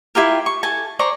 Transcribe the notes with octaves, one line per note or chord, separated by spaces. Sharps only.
E4 F4 G4 A#4
C#6
A4 G#5 A5
C5 D5 A#5 C#6